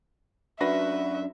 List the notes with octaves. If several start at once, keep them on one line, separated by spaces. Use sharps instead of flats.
F#2 D4 F#4 B4 E5 A#6